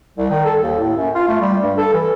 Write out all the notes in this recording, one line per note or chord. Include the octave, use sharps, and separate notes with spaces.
C2
D#3
A4
D#2
A2
F#2
F4
A3
G3
G2
A4
E3